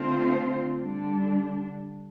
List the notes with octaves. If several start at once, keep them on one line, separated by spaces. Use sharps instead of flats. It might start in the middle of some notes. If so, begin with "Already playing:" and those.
Already playing: D3 A3 C4 F4 C5
D3 G3 D4